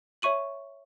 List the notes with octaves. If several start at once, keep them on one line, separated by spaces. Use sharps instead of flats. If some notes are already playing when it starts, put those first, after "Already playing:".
C#5 E5 C#6 D#7 F#7